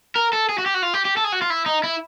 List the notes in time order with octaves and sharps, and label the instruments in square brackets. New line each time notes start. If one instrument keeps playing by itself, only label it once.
[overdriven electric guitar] A#4
A4
G#4
F#4
G4
F#4
F4
G4
G4
A4
G#4
F#4
F4
E4
D#4
E4